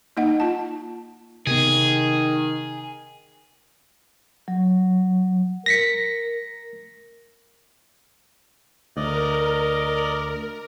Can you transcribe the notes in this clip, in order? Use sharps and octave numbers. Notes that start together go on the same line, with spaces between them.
A#3 D#4 D#5 F#5
F4 A5
C3 D#3 B3 G#4
F#3
A#4 A#6 B6 C#7
D2 A#4 D5 D#5